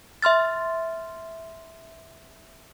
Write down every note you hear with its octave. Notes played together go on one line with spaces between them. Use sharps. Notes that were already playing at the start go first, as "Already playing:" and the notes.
E5 C6 F6 A6